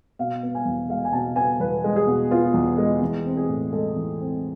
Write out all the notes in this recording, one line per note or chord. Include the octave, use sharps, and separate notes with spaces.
B2 F5
B3
G#5
E2
G#3 F5
G#5
B2 A5
B3 G#5
E2 B4
G#3
G#4
B2
B3 F4
E2
G#3
E3
C4
G#4
A2
G#3 A4
E3
C4